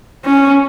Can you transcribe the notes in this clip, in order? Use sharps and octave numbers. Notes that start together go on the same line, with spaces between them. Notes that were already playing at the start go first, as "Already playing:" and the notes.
C#4